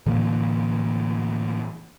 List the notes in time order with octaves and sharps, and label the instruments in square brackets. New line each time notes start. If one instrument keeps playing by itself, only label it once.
[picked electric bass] A2 D3 E3 A#3